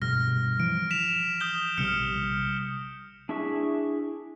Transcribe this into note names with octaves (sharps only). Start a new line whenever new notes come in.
G2 B2 F6 A#6
E3 F3 D7
B6 E7 F7
D#6 G6 G7
A#1 C3 G3 F6 C#7
D4 E4 G#4 E5 C#6